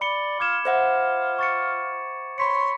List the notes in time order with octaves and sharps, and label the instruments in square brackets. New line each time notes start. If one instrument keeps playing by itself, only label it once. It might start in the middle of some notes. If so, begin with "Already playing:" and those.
[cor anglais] D5 [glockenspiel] B5 C#7 G7
[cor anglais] F4 [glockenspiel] D6 G#6 E7
[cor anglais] F4 [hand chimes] C5 E5 F#5
[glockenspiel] C#6 A6 C#7
[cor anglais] C#5 [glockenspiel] B5 B6 C#7 [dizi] C6